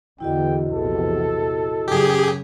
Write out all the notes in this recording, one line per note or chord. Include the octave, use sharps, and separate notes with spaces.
E2 D3 E4 F#4 D#5 G5
A#1 E2 C3 A4
F#2 C#3 G4 G#4